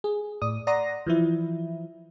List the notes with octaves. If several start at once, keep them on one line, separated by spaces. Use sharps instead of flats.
G#4
A2 D5 D#6
D5 F#5 A#5 C6 D#6 A#6
E3 F3 E4